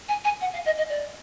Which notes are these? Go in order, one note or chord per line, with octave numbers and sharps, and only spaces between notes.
G#5
G#5
F#5
F5
D#5
D#5
D5